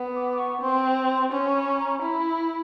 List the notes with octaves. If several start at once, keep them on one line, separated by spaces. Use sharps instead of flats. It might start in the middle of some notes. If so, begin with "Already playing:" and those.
Already playing: B3
D6
D6
C#6
C4 C6
C#4 C6
B5
A#5
E4 B5
B5